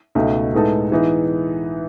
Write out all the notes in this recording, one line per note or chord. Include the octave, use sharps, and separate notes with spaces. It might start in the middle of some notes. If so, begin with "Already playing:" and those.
C#2 B2 A3 D#4
A2 G#3 B3 D#4 A4
E3 B3 D#4 G#4